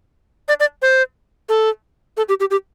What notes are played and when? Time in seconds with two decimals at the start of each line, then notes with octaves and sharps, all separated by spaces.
0.48 D5
0.60 D5
0.82 C5
1.49 A4
2.17 A4
2.29 G4
2.40 G4
2.51 G4